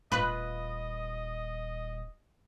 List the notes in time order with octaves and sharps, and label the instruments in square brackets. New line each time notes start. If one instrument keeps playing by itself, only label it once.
[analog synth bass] D#1 [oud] F4 B4 [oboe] D#5